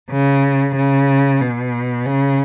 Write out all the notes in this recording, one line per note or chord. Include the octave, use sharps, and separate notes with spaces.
C#3
C#3
B2
C#3